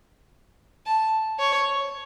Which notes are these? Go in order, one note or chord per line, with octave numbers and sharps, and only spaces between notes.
A5
C#5